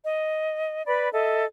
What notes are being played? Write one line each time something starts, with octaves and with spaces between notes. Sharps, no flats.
D#5
B4 D5 B5
A4 D#5 E5